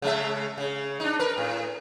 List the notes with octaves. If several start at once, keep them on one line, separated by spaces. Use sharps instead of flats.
C#3 G#3 E5
C#3
D4 D#4
A#4 B4
A2